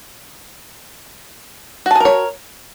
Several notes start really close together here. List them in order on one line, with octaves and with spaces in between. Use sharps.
F#4 A5 G#4 A#4 C#5